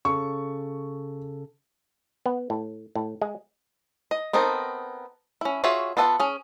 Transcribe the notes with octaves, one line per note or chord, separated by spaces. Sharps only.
C#3 A4 C#6
B3
A2
A2
G#3
D#5
B3 C4 D#4 A4 A#4
C#4 E4
F4 F#4 G#4 C#5 E5
B3 F4 A4 D5 F#5
C#4 G#4